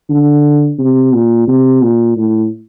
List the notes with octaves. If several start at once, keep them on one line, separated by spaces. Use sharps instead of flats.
D3
C3
A#2
C3
A#2
A2